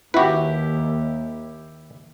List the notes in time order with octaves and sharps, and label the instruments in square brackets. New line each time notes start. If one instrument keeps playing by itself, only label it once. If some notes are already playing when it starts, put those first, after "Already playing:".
[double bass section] D#2 [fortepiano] E4 G4 [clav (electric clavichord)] F#4 B4